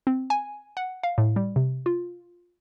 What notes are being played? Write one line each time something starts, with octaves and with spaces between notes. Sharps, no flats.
C4
G#5
F#5
F5
A2
G3
C3
F4